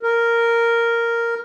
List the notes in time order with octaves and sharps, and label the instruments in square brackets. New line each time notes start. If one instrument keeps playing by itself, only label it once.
[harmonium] A#4